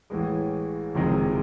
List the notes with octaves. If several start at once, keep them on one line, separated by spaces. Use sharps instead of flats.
A1 A2 E3 G#3
F#1 F2 C3 D#3 G#3